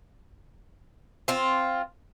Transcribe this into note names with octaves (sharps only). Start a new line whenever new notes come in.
C4 F4